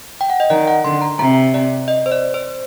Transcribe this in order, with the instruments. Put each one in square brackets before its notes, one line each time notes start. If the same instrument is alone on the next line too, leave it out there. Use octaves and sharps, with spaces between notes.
[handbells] G5
F#5
D#5
[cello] D#3 [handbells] D5
[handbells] F#5
[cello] D3 [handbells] C6
[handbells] A#5
[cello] C3 [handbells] A#5
[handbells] D5
D#5
C5
D5
C5